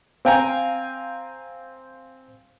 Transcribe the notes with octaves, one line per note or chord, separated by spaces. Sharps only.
C4 F5 G5 G#5 A#5